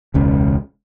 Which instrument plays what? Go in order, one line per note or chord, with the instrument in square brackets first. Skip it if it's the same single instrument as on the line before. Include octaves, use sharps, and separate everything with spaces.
[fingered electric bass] E1 C#2 C#4